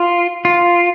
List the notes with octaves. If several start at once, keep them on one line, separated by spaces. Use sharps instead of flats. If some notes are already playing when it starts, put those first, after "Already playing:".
Already playing: F4
F4